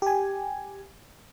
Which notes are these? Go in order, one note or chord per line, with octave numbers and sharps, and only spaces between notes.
G4 G#5